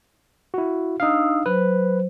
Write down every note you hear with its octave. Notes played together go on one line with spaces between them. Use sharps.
E4 F#4
D4 D#4 F5 D#6 E6
F#3 B4 C5